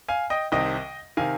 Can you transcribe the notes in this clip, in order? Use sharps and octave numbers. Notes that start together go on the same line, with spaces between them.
F5 G#5
D#5 G5
C2 C3 D#3 D#5 G5
C3 D#3 F5 G#5